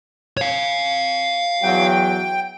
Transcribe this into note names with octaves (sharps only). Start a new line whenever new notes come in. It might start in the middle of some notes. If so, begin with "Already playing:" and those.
C#5 F5
E2 F#3 G5